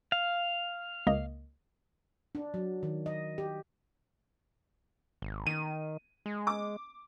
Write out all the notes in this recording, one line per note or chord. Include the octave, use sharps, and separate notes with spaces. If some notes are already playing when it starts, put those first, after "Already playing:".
F5
C#2 A#3 D#5
D4
F#3
D#3
D#5
G4
G#1
D#3 D#7
G#3
D6